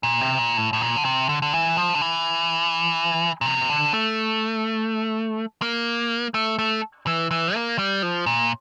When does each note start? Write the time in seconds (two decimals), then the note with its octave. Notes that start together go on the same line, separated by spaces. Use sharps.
0.03 A#2
0.21 C3
0.39 A#2
0.57 A2
0.73 A2
0.81 A#2
0.96 D3
1.05 C3
1.29 D3
1.42 D3
1.53 E3
1.77 F3
1.95 D3
2.01 E3
3.41 A#2
3.46 C3
3.70 D3
3.93 A3
5.62 A#3
6.34 A3
6.59 A3
7.07 E3
7.31 E3
7.55 A#3
7.78 G3
8.03 F3
8.26 A#2